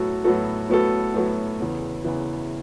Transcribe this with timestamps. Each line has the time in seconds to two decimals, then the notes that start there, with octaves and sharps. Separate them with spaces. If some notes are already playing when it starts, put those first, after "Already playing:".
Already playing: A2 F#3 B3 F#4 A4
0.24 A2 F#3 B3 F#4 A4
0.69 A2 F#3 B3 F#4 A4
1.14 A2 F#3 B3 F#4 A4
1.60 E2 C#3 E3
2.05 E2 C#3 E3